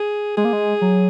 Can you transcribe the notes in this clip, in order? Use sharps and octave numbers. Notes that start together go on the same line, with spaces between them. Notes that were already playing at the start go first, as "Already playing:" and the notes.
Already playing: G#4
G#3 G#4
A#3
G#3
F#3